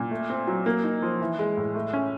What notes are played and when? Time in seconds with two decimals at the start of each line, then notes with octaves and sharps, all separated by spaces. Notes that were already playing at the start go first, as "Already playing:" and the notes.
Already playing: A#2
0.11 A3
0.30 C4
0.47 F#3
0.66 A#3
0.84 D#4
1.02 F3
1.21 E3
1.39 G#3
1.57 A2
1.75 A3
1.93 C#4